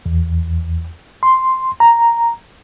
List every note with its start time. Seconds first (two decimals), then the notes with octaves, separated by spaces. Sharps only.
0.06 E2
1.23 C6
1.80 A#5